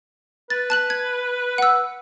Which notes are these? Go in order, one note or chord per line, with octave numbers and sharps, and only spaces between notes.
B4 A6
A5 F#6 F#7
G#6
F#5 E6